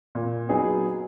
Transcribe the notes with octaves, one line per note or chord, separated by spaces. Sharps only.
A#2
F#3 B3 D#4 G#4